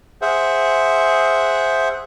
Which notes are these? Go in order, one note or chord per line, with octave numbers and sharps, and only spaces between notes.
G#4 C5 E5 F#5